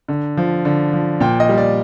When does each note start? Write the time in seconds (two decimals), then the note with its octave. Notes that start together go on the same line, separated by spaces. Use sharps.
0.08 D3
0.37 F3
0.65 D3
0.93 F3
1.20 A#2 G5
1.40 D#5
1.49 G3
1.58 D5